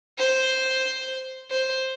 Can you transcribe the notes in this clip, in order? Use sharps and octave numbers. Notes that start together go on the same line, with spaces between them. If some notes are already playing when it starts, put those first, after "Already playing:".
C5
C5